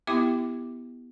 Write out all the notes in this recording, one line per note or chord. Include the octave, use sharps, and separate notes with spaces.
B3 E4 G4 E5 G5 D6